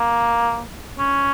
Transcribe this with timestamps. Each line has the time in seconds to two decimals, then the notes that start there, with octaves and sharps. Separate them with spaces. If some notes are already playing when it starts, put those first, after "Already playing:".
Already playing: A#3
0.99 C#4